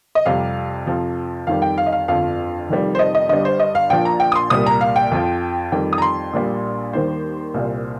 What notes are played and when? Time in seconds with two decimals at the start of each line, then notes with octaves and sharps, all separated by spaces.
0.15 D#5
0.26 F2 C3 G3 F5
0.87 F2 C3 F3
1.47 F2 D#3 G3 F5
1.62 G5
1.78 F5
1.86 D#5
1.92 F5
2.08 G1 F2 F3 F5
2.69 F1 F2 D#3 G3
2.95 C5
2.99 D#5
3.15 D#5
3.29 G1 G2 G3 D#5
3.45 C5
3.60 D#5
3.75 F5
3.90 A#1 A#2 F3 G5
4.05 A#5
4.20 G5
4.32 D#6
4.36 C6
4.50 C2 A#2 G3 D#6
4.66 A#5
4.81 F5
4.96 G5
5.11 F2 F3
5.72 F2 D#3 G3 G5
5.93 D#6
5.98 A#5
6.02 C6
6.33 A#1 A#2 G3
6.93 D#2 D#3 G3 C5
7.54 C2 A#2 G3